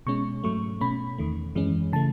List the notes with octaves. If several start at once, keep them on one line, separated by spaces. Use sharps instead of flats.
B2 G#3 C#4 C#6
G#2 F#3 A3 C#6
B2 A3 C#4 B5
E2 D#3 A3
F#2 E3 G#3 C#4
C#3 E3 A3 A5